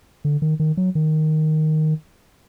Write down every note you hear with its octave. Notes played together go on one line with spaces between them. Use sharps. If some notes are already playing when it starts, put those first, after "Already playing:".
D3
D#3
D#3
F#3
D#3